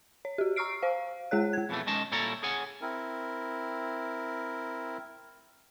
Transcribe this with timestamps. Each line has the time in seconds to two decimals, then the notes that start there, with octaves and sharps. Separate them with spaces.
0.25 C#5
0.38 F#4 G4
0.56 A#5 C#6 E6 F6 C7 D7
0.82 C5 F5
1.31 G#3 G#4 C#5 F#6
1.53 G#3 G#6
1.69 F2 B2 E3 A3
1.87 D#3 G#3 C#4 D#5 A5
2.12 A#2 G3 E4 A4 C#5 A#5
2.43 G#4 C#5 F#5 G#5
2.81 C4 E4 A#4